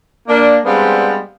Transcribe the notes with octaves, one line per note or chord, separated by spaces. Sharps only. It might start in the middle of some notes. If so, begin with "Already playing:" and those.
A#3 D4
G3 G#3 B3 C4 D4 F5